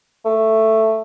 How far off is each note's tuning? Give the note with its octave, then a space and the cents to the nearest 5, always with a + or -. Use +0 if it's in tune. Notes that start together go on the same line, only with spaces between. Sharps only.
A3 +5